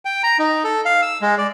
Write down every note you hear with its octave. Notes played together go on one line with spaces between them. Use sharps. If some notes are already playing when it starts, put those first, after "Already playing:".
G5
A#5
D#4
A4
F5
E6
G#3
D5